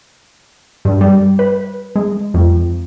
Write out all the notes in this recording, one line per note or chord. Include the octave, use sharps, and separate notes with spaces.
G2
G3
B4
G#3
F2